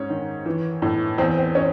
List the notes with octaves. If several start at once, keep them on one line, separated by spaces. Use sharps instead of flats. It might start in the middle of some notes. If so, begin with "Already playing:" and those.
Already playing: G#2 C#4
D#3
E3
A2
E2 C4
C4
C#4